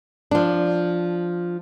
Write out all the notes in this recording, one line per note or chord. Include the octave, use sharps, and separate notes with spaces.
F3 D4